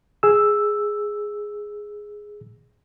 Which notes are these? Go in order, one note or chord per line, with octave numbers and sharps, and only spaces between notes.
G#4 E6